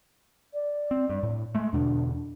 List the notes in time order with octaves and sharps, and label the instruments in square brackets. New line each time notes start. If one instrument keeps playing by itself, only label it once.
[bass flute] D5
[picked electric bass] C4
G2
A2
G#3 A3
[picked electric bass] E2 B2 D3 [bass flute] D4